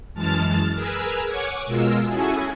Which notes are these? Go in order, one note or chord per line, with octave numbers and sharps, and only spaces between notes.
F#2 E3 G#3 A5 F6 A6
G#4 A#4 B4 G#5 E6 F6
C#5 F#5 G#5 C#6 D6
B2 G#3 F4 A#4 E6
C#4 E4 F#4 G#4 A4 G#5